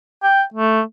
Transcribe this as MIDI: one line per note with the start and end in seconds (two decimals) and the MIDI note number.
0.23 0.43 79
0.54 0.81 57